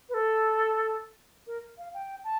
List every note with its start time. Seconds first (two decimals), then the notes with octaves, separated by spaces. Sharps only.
0.09 B4
0.14 A4
1.47 A#4
1.78 F5
1.94 G5
2.24 A5